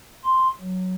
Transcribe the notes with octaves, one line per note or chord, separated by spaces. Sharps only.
C6
F#3